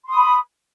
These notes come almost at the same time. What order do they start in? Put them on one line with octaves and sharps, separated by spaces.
C6 D#6 B5